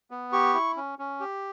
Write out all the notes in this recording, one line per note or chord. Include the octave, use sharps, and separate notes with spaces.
B3
G4 C#6
E4
C#4
C#4
G4